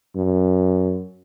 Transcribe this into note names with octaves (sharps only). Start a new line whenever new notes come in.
F#2